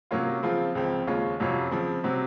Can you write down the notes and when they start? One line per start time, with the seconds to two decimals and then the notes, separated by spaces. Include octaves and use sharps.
0.11 C3 F#3 A#3 C#4 F4
0.43 C#3 F3 C4 F4
0.75 C#2 C#3 F3 C4
1.07 D#2 C#3 G#3 C#4 F4
1.40 F2 C3 F#3 C#4 F4
1.71 C#3 F3 C4
2.04 C3 F#3 C4